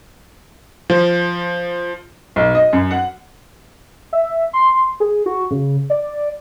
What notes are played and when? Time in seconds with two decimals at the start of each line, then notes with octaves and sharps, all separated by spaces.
0.90 F3
2.36 B1
2.55 D#5
2.73 F#2
2.91 F#5
4.13 E5
4.53 C6
5.00 G#4
5.26 F#4
5.51 C#3
5.90 D5